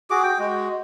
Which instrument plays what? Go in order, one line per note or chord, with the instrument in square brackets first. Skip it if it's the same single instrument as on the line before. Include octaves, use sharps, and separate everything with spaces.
[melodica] F#4 G#4 D6
G5
G#3 F#4